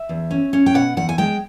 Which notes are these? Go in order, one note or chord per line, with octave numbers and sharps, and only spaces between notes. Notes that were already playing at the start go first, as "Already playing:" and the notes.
Already playing: E5
E2
C#4
C#4
G5
B2 F#5
E2 F#5
G#5
G#3 G5